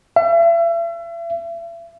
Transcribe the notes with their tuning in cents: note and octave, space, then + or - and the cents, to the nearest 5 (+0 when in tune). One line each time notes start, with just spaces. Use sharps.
E5 +40